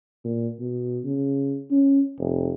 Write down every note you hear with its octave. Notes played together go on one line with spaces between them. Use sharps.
A#2
B2
C#3
C#4
F1